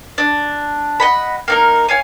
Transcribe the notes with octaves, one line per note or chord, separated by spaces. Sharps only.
D4
D#5 F#5 B5
A#3 D#4 A#4
C#5 F5 G#5